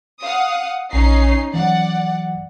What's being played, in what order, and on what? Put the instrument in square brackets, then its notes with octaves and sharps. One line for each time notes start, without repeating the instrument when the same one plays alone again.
[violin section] F5 F#5 D#6
[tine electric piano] A#1 [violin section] C#4 D#4 C7
[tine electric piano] E3 F#3 [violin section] D5 F#5